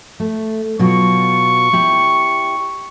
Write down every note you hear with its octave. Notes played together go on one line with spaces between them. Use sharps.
A3
B2 F#3 F4 C#6
E4 G4 D5